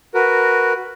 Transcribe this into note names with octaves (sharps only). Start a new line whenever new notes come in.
F#4 A#4 B4